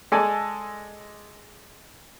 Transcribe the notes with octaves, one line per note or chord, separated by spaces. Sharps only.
G#3 A4 D5 G#5